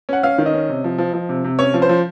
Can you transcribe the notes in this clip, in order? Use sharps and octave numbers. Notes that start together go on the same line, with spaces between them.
C#4 F#5
C#4 F5
D#3
D#5
C#4
C3
F3
F3
F3
C3
C3
C#4 C#5
F3
C5
F3